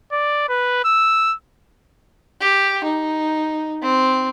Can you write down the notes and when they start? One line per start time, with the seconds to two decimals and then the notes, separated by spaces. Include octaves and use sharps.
0.12 D5
0.49 B4
0.85 E6
2.41 G4
2.84 D#4
3.82 C4